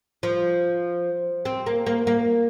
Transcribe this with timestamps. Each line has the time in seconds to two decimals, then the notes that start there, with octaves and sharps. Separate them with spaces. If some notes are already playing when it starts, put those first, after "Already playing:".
0.23 F3
1.45 C4
1.66 A#3
1.86 A#3
2.07 A#3